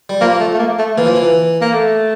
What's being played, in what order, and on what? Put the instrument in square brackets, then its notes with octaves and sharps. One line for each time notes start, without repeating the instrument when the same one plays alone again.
[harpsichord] G3
[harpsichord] F3 [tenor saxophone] A#3
[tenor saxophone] A3
A3
A#3
A3
[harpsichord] E3 [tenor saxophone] A#3
[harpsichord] F3
E3
[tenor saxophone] A#3
A3